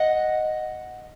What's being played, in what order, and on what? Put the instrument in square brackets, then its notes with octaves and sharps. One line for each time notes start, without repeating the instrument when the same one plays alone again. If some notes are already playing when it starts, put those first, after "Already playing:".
Already playing: [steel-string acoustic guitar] D#5 F#5